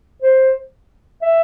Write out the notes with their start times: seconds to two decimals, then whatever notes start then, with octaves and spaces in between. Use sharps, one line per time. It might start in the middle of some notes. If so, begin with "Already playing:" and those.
0.22 C5
1.22 E5